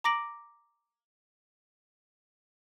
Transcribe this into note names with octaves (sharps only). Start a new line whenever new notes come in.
A#5 D6 A#6 D7 F#7